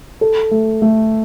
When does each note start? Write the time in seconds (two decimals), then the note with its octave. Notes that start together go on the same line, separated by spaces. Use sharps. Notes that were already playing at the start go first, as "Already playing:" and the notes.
0.21 A4
0.51 A3
0.82 A3